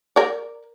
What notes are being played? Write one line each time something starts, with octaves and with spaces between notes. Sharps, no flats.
A#4 D5